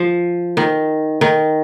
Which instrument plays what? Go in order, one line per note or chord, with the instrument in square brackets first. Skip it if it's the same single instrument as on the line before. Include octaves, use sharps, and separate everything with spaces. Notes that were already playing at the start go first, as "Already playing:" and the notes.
Already playing: [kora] F3
D#3
D#3